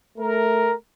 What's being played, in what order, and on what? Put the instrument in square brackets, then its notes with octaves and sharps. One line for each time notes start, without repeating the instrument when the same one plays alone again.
[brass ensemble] A3 A#4